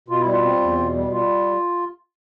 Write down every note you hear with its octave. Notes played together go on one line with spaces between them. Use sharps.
B2 F4
E4
G3
F4
C4
E2
B2
G3
G3 F4